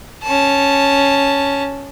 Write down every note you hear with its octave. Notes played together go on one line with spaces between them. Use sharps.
C#4 A5